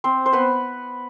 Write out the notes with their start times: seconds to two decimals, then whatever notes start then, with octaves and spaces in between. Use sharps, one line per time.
0.04 C4 C5
0.26 C5
0.33 B3 B4